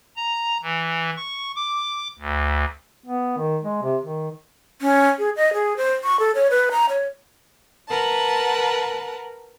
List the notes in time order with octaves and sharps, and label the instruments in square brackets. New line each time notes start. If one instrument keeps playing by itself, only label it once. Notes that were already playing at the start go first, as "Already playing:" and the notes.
[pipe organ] A#5
E3
C#6
D6
D2
[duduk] B3
D#3
G#3
C3
D#3
[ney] C#4
G#4
D#5
G#4
C5
C#6
A4
C#5
B4
A#5
C#5
[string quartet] A#4 B4 F#5 A5